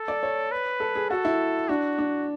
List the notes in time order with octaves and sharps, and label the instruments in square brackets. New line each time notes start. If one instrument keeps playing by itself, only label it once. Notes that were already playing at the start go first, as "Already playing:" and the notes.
Already playing: [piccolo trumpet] A4
[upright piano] D5
C#5
[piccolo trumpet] B4
[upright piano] A4
G#4
[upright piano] F#4 [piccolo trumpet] A4
[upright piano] E4
[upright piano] D4 [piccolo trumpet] F#4
[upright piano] D4